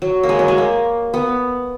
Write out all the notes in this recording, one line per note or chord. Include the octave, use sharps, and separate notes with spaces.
F#3
A#3
G#3
F#3
G#3
A#3
B3